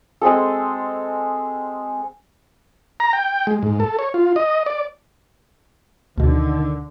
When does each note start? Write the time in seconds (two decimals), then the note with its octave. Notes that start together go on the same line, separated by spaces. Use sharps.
0.21 G#3 C4 G#4 A4
3.00 A#5
3.13 G5
3.47 G#3
3.63 G#2
3.80 A4
3.99 C#5
4.14 F4
4.36 D#5
4.66 D5
6.18 D2 B2 D3 D#3